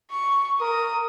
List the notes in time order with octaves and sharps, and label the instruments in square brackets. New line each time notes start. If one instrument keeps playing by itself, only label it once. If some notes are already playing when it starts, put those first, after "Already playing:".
[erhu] C#6
[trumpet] A#4 [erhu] D#6